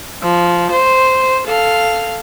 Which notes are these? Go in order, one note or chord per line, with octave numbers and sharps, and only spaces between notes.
F3
C5
A4 F5 F6